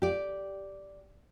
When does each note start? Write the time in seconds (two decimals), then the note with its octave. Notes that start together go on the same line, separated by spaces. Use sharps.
0.02 G4 D5